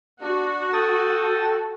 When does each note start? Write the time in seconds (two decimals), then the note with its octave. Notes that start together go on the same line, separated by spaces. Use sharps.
0.22 D4 F#4
0.73 A4 G5 D#6 A6